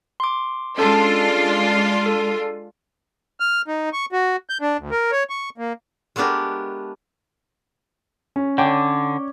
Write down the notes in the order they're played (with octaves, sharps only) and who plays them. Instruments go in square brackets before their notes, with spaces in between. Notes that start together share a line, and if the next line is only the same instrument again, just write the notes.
[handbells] C6 D6
[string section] G#3 D4 F4 [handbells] C#4 A4 A5
[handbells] A4
[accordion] F6
D#4
C#6
F#4
G6
D4
D2
A#4
C#5
C#6
A#3
[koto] G#3 A3 B3 D4 G4 A#4
[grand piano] C#4
[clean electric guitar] D3 [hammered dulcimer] C#5 D5 [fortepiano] G5